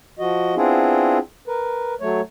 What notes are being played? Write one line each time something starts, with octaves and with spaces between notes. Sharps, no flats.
F3 F#4 D#5
B3 C4 D4 E4 F4 G#4
A#4 B4
F#3 A3 C#5